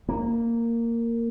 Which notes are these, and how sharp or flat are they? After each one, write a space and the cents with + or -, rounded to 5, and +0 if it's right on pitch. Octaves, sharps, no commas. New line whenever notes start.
A#3 -10